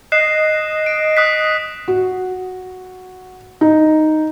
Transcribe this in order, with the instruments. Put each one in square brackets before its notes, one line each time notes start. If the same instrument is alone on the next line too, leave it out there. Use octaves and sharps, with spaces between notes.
[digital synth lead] D#5 [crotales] F#6 C7 E7
[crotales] D7
D#6 F#6 B6
[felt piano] F#4
D#4